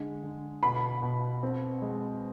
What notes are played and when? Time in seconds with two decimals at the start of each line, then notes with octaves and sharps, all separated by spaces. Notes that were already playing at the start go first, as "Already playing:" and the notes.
Already playing: D3 G#3
0.23 D3
0.63 B2 B5
1.02 B2
1.43 C4
1.82 G#3